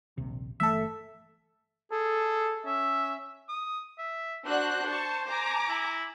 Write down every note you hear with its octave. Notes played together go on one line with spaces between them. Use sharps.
D#1 A#1 C3
G1 E3 A3 A4 E5
G#4 A4
C#4 E5
D#6
E5
D4 F#4 C5 F#6
A5 C#6
G#5 A#5 D6
E4